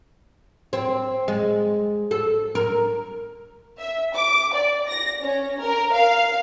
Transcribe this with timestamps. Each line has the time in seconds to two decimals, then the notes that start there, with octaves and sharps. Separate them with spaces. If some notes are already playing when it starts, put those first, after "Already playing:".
0.73 C4
1.28 G#3
2.11 A4
2.55 A#4
3.80 E5
4.15 D6
4.55 D5
4.88 A#6
5.23 C#4
5.61 A#4
5.94 F5